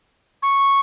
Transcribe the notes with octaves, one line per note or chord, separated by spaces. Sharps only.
C#6